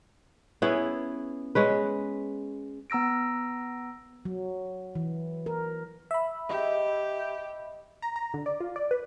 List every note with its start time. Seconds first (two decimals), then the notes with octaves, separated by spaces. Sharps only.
0.62 B3 C#4 E4 G#4
1.55 G#3 C#4 B4
2.90 B3 A#5 E6 A#6 D7
4.25 F#3
4.95 E3
5.46 A#4
6.11 E5 B5
6.49 G4 D#5
8.02 A#5
8.16 A#5
8.34 D3
8.46 D5
8.60 F4
8.76 D5
8.91 B4